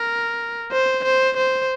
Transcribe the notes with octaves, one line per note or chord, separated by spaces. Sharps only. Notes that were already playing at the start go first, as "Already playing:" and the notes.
Already playing: A#4
C5
C5
C5